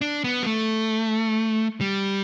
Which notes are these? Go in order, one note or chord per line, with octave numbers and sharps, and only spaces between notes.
D4
B3
G3
A3
G3